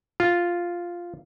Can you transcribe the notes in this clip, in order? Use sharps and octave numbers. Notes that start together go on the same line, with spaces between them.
F4